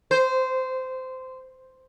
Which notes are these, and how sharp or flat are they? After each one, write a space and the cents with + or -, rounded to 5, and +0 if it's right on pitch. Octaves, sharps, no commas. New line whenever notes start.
C5 -15